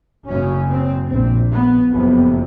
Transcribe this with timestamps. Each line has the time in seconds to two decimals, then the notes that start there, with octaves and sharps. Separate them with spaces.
0.27 F#1 F#2 C#3 C#4
0.69 C4
1.09 A#1 A#2 C4
1.51 B3
1.92 F#1 F2 C3 B3